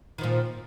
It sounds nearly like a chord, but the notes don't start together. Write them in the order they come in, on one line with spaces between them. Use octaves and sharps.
D#3 F3 A#2